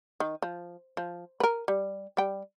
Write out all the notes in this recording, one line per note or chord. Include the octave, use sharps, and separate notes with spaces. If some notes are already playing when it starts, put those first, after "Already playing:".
D#3
F3
F3
A#4 B4
G3
G3 G5